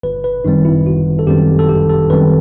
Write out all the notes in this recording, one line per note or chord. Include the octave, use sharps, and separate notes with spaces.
G1 B4
B4
F#2 D#3 G3 C4 D#4
E4
G1 F#4
A4
F#2 D#3 G3 C4 G4
A4
G1 G4
A4
F#2 D#3 G3 C4 B4